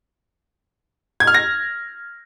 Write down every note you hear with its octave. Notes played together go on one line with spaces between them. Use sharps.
G#6
F6
A#6